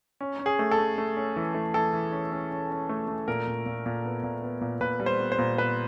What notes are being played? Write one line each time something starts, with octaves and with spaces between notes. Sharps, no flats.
C#4
C#4
G#4
A3
A4
A3
A3
C#4
E3
A3
E3 A4
E3
C#4
C#4
C#4
C#4
A3
A3
A#2 A#4
A#2
A#2
A#2
B3
A#2
B3
A#2
A#2 B4
G3
C5
B3
C5
A#2
B3 B4